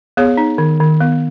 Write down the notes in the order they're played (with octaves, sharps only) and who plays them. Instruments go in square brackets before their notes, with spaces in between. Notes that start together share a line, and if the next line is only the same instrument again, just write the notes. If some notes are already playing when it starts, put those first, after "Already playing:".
[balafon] B3 G#4 C#5
D#4
D#3
D#3
B3